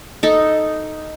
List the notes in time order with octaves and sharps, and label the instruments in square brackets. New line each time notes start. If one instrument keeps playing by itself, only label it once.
[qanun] D#4 A4